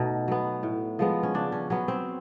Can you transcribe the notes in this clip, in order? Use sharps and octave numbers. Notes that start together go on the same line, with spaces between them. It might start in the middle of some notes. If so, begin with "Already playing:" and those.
Already playing: B2 A3 D#4
F#3 B3
A2
F3 G#3 B3
C#4
C#3 D4
C#4
F#3 B3 C#4
C4